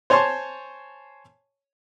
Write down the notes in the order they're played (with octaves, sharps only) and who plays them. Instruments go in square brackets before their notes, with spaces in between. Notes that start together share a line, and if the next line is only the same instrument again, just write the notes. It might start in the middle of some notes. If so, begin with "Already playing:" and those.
[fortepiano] C5 C#5 G#5 A5 C6 C#6